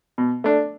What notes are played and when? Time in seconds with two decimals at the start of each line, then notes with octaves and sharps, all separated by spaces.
0.18 B2
0.44 A3 D4